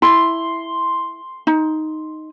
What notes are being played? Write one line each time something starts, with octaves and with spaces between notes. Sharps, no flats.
E4 C6
D#4